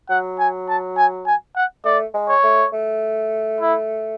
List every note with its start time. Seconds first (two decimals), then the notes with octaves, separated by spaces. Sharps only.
0.09 F#3 F#5
0.39 G#5
0.68 A5
0.97 G#5
1.26 G#5
1.56 F#5
1.84 A3 D5
2.14 G#3
2.29 C#5
2.44 A3
2.73 A3
3.61 E4